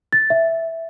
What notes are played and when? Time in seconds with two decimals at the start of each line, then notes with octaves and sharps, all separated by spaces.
0.13 A6
0.30 E5